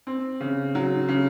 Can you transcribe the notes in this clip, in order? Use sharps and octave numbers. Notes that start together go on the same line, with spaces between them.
C4
C#3
F#3
C#3